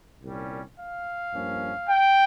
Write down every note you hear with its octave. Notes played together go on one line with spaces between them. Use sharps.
C2 A#2 G3 C#4
F5
G2 F3 A#3 C#4
G5